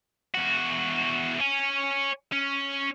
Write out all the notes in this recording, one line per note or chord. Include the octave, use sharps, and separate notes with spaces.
E2 F#4
C#5 G#5
C#4